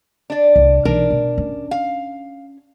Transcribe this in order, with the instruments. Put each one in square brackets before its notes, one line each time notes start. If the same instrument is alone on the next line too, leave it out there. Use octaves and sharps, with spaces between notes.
[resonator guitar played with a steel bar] D4 D5
[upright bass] C2
[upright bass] B1 E3 [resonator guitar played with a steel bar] D4 A#4
[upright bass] B2
C#4
[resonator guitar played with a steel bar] F5